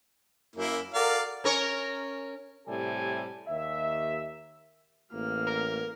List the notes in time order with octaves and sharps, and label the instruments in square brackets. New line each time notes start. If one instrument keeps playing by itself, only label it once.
[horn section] F#2 [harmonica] A#3 E4
[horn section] F#4 A4 A#4 [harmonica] D5 F5
[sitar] C#4 A#4 C#5
[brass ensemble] A2 C3 G3 A4 G#5
D#2 E5
[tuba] A1 [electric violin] A#3 F6
[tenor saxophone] A#4